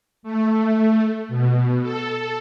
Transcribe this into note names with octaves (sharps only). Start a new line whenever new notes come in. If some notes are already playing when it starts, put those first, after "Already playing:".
A3
B2
A4